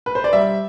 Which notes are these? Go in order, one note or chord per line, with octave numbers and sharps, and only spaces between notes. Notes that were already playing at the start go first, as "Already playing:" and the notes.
B4
C5
D5
G3 E5